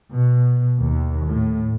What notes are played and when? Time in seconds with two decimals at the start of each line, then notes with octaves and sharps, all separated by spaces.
0.13 B2
0.85 D#2
1.29 A2